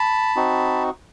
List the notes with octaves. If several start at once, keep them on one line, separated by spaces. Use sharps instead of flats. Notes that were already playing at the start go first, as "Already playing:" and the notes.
Already playing: A5 B5
C4 D#4 F#4